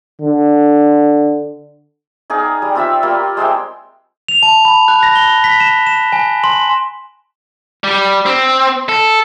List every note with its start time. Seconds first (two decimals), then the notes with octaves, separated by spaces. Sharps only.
0.21 D3
2.30 D#4 G#4 D5 F5
2.62 G3
2.75 C4 F4 E5 E6
3.03 G3 A#3 F4 G4
3.37 G#3 C5 E5 G5
4.28 F7
4.43 A5
4.65 B5
4.88 F#6
5.03 A#6
5.15 G7
5.44 B6
5.60 E7
5.87 E7
6.13 G#5
6.44 C6
7.84 G3
8.26 C4
8.89 A4